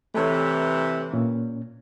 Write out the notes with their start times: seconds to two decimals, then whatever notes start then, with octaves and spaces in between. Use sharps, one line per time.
0.14 C3 E3 A3 A4 C#5
1.13 A#2 C#4